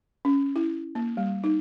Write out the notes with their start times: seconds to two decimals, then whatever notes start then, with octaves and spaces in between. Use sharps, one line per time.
0.25 C#4
0.56 E4
0.95 A#3
1.17 G3
1.44 D#4